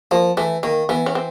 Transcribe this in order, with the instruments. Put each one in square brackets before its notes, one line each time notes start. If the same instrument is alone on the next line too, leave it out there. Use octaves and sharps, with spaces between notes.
[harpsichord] F3 [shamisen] A#3
[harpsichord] E3 [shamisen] A3
[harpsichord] D#3 [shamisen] A#3
[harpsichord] E3 [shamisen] B3
[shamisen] C#4
C4